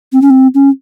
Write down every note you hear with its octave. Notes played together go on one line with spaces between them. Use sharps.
C4
C#4
C4
C#4